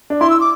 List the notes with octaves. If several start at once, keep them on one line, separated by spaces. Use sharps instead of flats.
D4
E4 C6
E6
D6